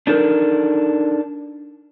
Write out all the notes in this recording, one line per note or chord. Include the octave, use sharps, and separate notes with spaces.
D4 D#4 A4 A#4